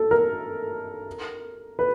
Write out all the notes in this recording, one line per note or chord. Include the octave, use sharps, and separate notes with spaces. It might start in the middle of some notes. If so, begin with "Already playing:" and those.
Already playing: A4
A#4
B4